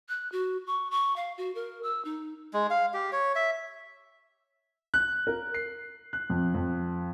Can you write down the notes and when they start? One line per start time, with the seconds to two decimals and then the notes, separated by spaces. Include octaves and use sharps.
0.09 F#6
0.32 F#4
0.67 C#6
0.91 C#6
1.16 F5
1.38 F#4
1.55 A#4
1.83 E6
2.05 D#4
2.53 G#3
2.70 F5
2.93 G4
3.12 C#5
3.35 E5
4.94 F#6
5.27 A#4
5.54 C7
6.13 F#6
6.30 F2
6.54 F2